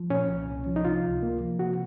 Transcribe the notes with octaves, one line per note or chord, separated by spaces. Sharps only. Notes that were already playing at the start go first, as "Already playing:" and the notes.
Already playing: F3
A#2 C#4
C2
C2
F3
D#4
C3 F4
C#2
A#3
F3
C3 F#4